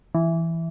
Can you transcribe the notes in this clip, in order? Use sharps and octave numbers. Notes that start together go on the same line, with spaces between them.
E3